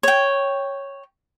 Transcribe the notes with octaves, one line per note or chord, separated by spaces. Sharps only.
C#5 G5